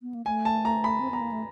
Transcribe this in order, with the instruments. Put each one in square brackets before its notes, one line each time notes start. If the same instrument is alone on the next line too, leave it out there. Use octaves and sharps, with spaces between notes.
[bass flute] B3
A#3
[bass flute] A3 [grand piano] G#5
[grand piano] A5
A#5
B5
[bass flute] C4
[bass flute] B3 [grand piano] A#5
[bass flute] A#3
A3